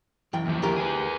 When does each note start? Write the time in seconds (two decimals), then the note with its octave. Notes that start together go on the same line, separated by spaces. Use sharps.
0.33 F#2 E3 G5
0.46 D#2 F3
0.62 D2 G4 A#4
0.76 G#4 B4